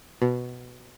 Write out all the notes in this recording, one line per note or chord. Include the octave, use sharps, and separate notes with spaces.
B2